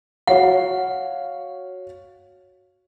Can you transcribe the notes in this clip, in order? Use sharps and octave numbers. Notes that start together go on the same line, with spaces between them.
F#4 C#5 F5 F#5